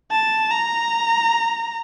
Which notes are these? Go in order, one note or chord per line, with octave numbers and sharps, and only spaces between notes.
A5
A#5